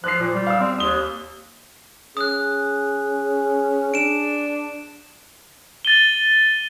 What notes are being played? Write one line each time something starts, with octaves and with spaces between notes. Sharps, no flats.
F3 F#6 C7
A#2
G3
F5 E6
C4 D5
D#2 D#6 G7
C#4 G#4 D#6 F#6
D4 D7 E7
A6 D#7 G7